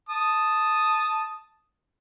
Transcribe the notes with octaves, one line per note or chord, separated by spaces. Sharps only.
A5 D#6